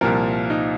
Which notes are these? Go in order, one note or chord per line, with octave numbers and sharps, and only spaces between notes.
C2 A#2 F3 A#4
D#4